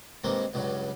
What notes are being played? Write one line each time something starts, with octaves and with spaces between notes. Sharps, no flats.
G2 D#3 G#3 A#3 C4
C#2 G2 C#3 F#3